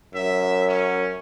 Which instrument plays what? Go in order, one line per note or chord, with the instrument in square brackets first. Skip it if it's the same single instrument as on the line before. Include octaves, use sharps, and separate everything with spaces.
[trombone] F#2 [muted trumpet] E5
[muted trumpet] C#4